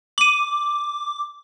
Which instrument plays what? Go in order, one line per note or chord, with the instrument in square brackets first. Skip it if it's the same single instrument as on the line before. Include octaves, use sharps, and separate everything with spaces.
[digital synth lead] D6 [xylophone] D#7 F#7